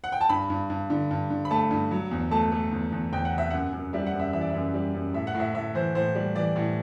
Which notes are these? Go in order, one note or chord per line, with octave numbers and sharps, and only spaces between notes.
F#5
G5
A5
G2 B5
G2
G2
D3
G2
D3
B5
A3 A5
G2
F#3
E2
A3 A5
A3
E2
E2
E2 G5
F#5
C3
E5
F#2 F#5
F#2
G3 E5
F#5
F#2
E5
E3 E5
D5
F#2 E5
G3
F#2
A2 E5
F#5
A2
E5
A2 E5
E3 C5
A2 C5
G3
E3 D5
A2